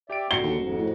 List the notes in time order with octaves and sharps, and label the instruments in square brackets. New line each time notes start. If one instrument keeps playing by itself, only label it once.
[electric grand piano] G4 G5 D7 [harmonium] D5 E5
[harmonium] D3 [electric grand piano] F#4 C7 C#7 [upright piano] G7
[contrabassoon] D#2
[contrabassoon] D#1 [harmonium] F2 G#2
[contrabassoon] A2